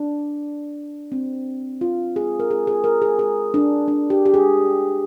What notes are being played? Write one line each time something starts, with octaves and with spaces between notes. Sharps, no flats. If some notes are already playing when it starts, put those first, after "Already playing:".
Already playing: D4
C4
F4
G#4
A#4
G#4
G#4
A#4
G#4
G#4
D4
D4
G4
G4
G#4